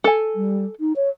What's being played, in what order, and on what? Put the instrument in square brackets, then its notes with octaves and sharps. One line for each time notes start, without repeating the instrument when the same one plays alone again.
[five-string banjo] A4 G#5
[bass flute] G3
D#4
C#5